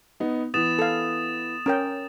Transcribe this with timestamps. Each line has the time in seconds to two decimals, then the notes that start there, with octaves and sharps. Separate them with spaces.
0.20 B3 D#4
0.54 E3 B3 D#6 A6 E7
0.79 A4 F5
1.66 C#4 A#4 G5